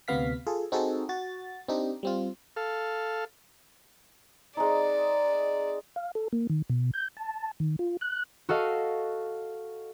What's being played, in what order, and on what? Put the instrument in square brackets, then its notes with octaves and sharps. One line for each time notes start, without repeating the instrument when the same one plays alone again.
[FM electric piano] D2 C3 B3 F5 B6
F4 G#4 A4
C4 D#4 F#4 G#4 A4
F#4 A6
C4 D4 D#4 G4
G3 C4 F4
[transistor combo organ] A4 F5
[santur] G#3 C4 D#4 [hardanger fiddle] D5
[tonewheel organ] F5
A4
A#3
D#3
B2
G6
A5
D#3
F4
F#6
[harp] F#4 A4 D#5 F5